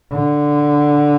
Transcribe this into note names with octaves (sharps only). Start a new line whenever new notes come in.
D3